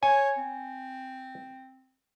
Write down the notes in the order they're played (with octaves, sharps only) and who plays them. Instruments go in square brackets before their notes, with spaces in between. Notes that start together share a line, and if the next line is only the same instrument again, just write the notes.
[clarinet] C#5 [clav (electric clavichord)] G#5
[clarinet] C4